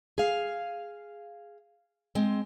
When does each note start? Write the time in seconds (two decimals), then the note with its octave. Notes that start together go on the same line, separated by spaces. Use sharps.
0.18 G#4 F5
2.15 G#3 C4